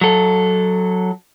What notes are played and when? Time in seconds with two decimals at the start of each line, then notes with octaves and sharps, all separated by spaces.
0.01 F#3 A4